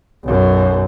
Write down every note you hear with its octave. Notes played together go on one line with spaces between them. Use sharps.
B1 F#2